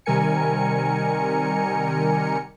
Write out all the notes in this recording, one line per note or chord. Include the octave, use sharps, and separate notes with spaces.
C3 D#3 G3 A#4 G#5 C#7